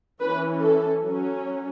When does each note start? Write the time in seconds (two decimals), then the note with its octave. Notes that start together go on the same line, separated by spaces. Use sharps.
0.22 E3 C#4 B4
0.62 A4
1.04 F#3 C#4